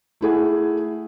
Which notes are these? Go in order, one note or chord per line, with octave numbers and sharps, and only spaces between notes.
A3 E4 G#4 F#5